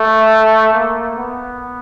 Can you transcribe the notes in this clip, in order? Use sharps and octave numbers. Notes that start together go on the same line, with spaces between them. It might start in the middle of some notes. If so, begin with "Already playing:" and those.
Already playing: A3
A#3
B3